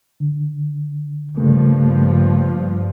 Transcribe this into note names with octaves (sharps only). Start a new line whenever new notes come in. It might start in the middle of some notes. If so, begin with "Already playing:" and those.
D3
G2 C#3 F3 A3 A#3